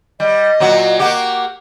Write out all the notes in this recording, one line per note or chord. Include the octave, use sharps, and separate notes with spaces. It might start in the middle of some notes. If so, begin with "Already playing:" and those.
G3 D#5
A#2 F#3 F#4
A#3 F#4 G4